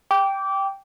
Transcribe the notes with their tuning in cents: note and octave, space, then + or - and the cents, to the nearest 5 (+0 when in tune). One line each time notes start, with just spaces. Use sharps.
G5 +0 D6 -20